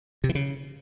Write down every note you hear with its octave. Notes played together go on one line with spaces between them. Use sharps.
C3
E3
C#3